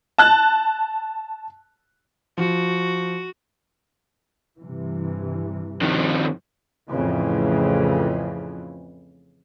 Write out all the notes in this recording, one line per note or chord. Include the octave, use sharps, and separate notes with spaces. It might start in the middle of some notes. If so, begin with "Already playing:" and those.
A5 F#6
F3 F#4
G2 C3 E3
F2 D#3
F2 A2 C#3 E3